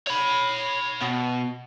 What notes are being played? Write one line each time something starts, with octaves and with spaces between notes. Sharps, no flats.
C#5 B5
B2